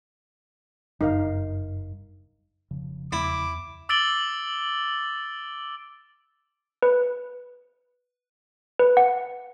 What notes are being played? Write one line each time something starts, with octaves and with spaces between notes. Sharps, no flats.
F#1 G2 D#4 A#4 F5
F1 C#3 F3
E2 E4 D6
D6 E6 A6 D7 F#7 G7
B4
B4
F#5